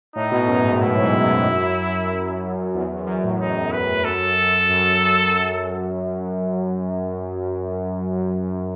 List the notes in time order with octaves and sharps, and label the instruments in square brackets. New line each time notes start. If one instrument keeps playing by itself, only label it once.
[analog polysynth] A2 [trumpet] D#4
[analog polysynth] B2
F#2
G#2
[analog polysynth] A2 [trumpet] E4
[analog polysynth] G#2
F#2
E2
F#2
F#2
A2
[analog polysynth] A2 [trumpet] D#4
[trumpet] B4
[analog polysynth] F#2 [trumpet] A4
[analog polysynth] F#2